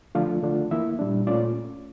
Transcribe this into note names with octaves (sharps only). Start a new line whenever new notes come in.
D3 F3 A3 D4 F4 F5
D3 A3 D4 F4
E3 A#3 E4 E5
A#2 G3 D4
A#2 A3 C#4 F4 D5